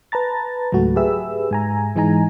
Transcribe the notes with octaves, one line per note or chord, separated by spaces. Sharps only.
B4 A5 A#5 A6
C#2 G#2 F#3 A3 F#4
G4 G#4 B4 E5 E6
G#2 G#5 A#5
G#2 E3 G#3 D#4 G#5 A#5